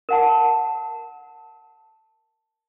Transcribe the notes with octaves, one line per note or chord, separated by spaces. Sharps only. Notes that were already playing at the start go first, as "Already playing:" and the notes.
A#4 F#5 A5